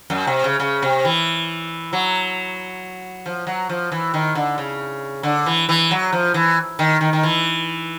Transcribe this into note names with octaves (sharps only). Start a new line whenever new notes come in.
F#2
C3
C#3
C#3
C3
E3
F#3
F3
F#3
F3
E3
D#3
D3
C#3
D3
E3
E3
F#3
F3
E3
D#3
D#3
D#3
E3